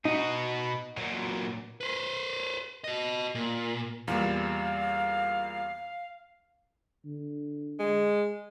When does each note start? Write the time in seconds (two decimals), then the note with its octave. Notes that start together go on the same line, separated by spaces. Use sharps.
0.05 B2 D#4 F#4
0.97 A#2 F#3
1.81 B4 C5
2.84 F#4 D#5
3.35 A#2
4.08 E2 A#2 G3 F5
7.05 D3
7.80 G#3